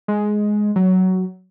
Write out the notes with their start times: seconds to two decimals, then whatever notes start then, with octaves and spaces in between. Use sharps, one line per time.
0.08 G#3
0.76 F#3